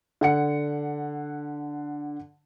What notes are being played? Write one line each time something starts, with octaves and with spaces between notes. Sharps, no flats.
D3 F#5 C#7